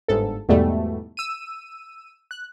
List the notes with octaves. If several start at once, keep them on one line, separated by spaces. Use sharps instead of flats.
G1 G#2 A4
E2 G#2 B2 G3 A3
E6 D#7
F#6